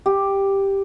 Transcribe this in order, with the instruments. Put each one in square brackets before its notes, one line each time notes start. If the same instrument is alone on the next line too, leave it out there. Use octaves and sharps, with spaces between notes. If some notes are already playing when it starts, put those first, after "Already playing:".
[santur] G4